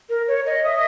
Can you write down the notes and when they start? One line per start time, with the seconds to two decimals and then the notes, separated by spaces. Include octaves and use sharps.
0.09 A#4
0.28 C#5
0.46 D#5
0.65 D#5 E5